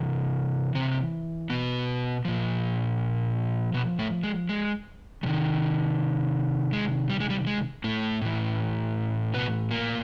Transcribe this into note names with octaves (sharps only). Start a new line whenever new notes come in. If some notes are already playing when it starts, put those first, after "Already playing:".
Already playing: C3 E3
C3 C4
B2 B3
A#2 F3
B2 B3
A2 A3
G#3
G#3
C3 D#3 G3
G#3
G3
G#3
G3
G#3
A2 A3
A2 E3
B2 B3
A#2 A#3